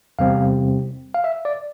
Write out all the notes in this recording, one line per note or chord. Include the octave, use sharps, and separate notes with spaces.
E2 C3 G3 C4 F5
F5
E5
D5